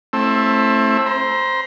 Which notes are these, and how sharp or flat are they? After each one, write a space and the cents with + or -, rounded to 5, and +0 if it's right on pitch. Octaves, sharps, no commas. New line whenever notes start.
A3 +0 C4 +30 E4 +0
C5 +0 A#5 +35